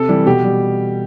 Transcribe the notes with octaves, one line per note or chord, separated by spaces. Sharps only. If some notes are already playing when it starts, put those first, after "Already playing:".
Already playing: C3 A4
E3 G3
B2 G4
G3